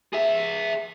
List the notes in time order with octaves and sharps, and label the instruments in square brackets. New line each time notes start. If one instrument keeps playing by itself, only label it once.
[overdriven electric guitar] G#4 E5